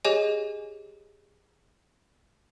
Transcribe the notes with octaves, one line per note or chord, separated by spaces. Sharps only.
G4 G#4 C#5 D#5 G#5